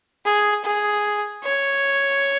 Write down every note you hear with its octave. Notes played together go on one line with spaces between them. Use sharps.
G#4
G#4
C#5